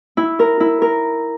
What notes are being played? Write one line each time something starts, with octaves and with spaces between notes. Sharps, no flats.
E4
A#4
E4
A#4